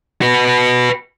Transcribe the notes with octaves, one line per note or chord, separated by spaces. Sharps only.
F#4 B4